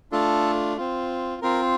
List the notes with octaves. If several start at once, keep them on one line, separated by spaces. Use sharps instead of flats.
A3 D4 F4 A4
C4 F4
C4 F4 A#4